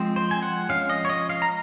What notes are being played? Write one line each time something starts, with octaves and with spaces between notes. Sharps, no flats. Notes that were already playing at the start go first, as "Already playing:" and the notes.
Already playing: F3 G#3 C4
C5
G#5
F#5
F3 G#3 C#4 F5
D#5
C#5
D#5
F5
A#5